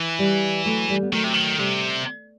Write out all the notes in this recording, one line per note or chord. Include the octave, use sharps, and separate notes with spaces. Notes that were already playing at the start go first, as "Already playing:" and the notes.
Already playing: E3
G3
F#3 A3
G3
B3
D#3 F#3 A3
C3
D#3
C3 G3